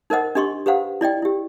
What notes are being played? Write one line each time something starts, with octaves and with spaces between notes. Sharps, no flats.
D#4 A#4 C5 D#5 F#5
D4 G4 D#5 C6 C#6
G4 B4 C5 F5 F#5
E4 D5 D#5 G5
E4 G4